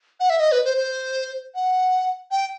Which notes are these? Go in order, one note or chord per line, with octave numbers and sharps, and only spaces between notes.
F#5
E5
D#5
B4
C5
C5
F#5
G5